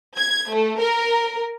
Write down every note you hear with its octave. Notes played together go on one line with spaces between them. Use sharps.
G#6
A3
A#4